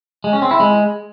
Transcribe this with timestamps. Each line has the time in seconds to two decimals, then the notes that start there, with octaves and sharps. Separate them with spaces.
0.24 G#3
0.33 C#4
0.42 C4
0.51 E4
0.60 G#3